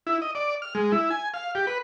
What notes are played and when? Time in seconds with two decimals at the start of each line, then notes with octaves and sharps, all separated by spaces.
0.07 E4
0.22 D#5
0.35 D5
0.62 F6
0.75 G#3
0.92 E4
1.11 G#5
1.34 F5
1.55 G4
1.67 B4